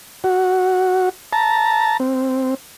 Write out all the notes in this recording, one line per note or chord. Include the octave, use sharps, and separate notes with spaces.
F#4
A5 A#5
C4